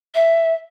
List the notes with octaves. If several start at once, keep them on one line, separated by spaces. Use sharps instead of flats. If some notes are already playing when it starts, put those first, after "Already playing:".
E5